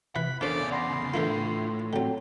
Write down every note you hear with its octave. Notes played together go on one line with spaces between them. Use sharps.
C3 E3 B5 F#6 B6
E2 A#2 C#3 C#4 D4 A4 C5 D5
F#5 B5 C6 A#6
A2 D3 E3 A#3 D4 F4
D3 F#3 C4 F#4 G5